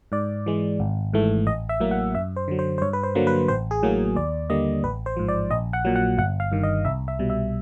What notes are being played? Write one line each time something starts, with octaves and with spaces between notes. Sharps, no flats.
G#2 D5
E3 G#3
G#1
G#2 E3 A3
A1 D#5
E5
A2 F#3 A#3
F#5
F#2 E5
C5
D3 F#3
C5
C5
G2 C#5
B4
C5
D3 F#3 A#3
B4
A1 C5
G#4
A2 F#3 A#3
D#2 D5
D3 G3 A#3 D#5
A1 B4
C5
G#2 F3
D5
A#1 D#5
F#5
A#2 F#3
F#5
G1 F#5
F5
G2 D#3
D#5
C2 E5
E5
B2 G3
E5